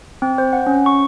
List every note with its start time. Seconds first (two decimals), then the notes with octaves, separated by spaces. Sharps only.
0.22 C4
0.38 C5
0.53 F#5
0.67 C#4
0.86 C#6